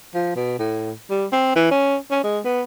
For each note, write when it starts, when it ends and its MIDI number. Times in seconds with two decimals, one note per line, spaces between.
0.14 0.33 53
0.36 0.54 47
0.59 0.91 45
1.10 1.26 55
1.32 1.51 60
1.55 1.69 52
1.71 1.96 61
2.11 2.23 61
2.23 2.39 56
2.45 2.62 59